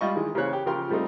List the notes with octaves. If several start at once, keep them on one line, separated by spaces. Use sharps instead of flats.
G3 F4 D#5 C#6
D#3 E3 G#3
C#3 E3 A#3 C5 C#5 F#6
G4
C#3 F3 G4 A#4 G5 C6
F3 G3 A3 C4 D#4